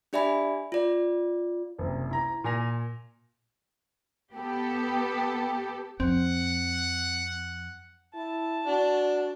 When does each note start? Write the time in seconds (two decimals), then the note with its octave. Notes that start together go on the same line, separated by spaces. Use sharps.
0.13 D4 G4 D5 E5 G#5 B5
0.72 F4 D5
1.79 F#1 C2
2.11 E4 A#5
2.44 A#2 G#5 A#6 F7
4.34 B3 G4 A4
6.00 F2 C4 F#5
8.15 E4 A5
8.67 D4 F#4